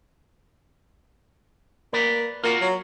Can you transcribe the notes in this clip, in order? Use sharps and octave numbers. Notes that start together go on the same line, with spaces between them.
A#3 B4 D5
A#3 F4 F#4 A#4
F#3